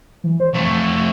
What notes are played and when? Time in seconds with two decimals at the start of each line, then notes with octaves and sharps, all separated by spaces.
0.24 E3
0.40 C5
0.54 F2 A3 C#6